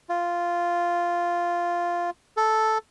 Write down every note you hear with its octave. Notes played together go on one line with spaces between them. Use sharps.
F4
A4